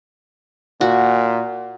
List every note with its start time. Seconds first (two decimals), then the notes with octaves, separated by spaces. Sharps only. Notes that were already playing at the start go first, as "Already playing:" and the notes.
0.81 A#2 F#4